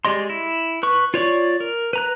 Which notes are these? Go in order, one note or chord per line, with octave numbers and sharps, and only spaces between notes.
G#3 G4 D5 D#5 C6
E4
B4 C#6
F4 C#5 D5 C#6
A#4
B4 A#5 F#6